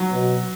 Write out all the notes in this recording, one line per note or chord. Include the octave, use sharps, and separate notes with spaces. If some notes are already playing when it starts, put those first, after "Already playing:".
Already playing: F#3
B2